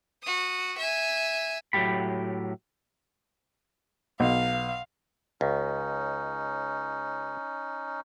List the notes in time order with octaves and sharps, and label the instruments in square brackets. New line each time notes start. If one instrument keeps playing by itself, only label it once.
[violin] F#4 D#6
E5 G#5
[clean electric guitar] A2 F#3 A3 G4 B5
[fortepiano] B1 [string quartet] F5
[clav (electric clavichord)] C#2 [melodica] C#4 D#4